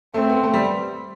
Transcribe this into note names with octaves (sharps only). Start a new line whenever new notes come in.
A3 C4
B3
A3
G3